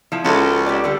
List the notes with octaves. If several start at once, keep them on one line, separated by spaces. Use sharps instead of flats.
F3 E4
C#2 C#4 F#4 A4
G4 D5
D3 G3